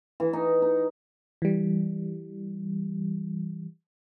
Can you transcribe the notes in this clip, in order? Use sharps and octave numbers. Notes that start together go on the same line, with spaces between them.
E3
D#4
D#4
E3 G3